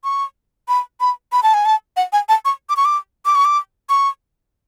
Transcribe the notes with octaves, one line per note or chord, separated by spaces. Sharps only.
C#6
B5
B5
B5
A5
G#5
A5
F#5
G#5
A5
C#6
D6
C#6
D6
D6
C#6
D6
C#6